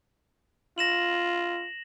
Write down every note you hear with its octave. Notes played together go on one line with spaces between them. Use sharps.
F4 A#6 E7 F#7